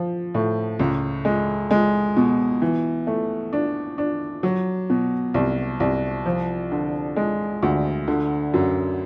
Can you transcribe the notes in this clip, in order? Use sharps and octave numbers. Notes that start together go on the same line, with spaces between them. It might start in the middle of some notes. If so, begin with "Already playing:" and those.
Already playing: F3
A2
C#2
G#3
G#3
B2
E3
A3
D4
D4
F#3
B2
C2
C2
F3
D3
G#3
D2
D3
F#2